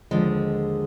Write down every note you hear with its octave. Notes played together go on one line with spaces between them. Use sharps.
D#2 D3 F3 G#3